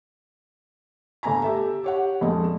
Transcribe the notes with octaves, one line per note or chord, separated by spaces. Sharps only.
G1 A3 G#5 A#5
G4 A4 E5
G4 C#5 F#5
A#1 F2 G#3 A3 D#5